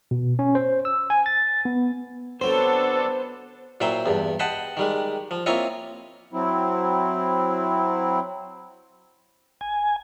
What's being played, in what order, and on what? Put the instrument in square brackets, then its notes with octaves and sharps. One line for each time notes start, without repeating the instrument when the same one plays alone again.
[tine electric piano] B2
C#4
C5
E6
G#5
A6
B3
[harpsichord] D3 F#3 C4 [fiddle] B3 [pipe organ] D4 A4 [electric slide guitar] C5
[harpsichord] A#2 F#3 E4 C5 G5
E2 G2
D#5 F#5 G5 A5 B5 C6
D#3 G3 G#3
F3
A#3 C4 E4 F4 C#5 D#5
[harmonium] F#3 C4 E4
[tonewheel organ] G#5